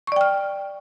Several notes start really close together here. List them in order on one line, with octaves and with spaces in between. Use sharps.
C#6 D5 G5 F6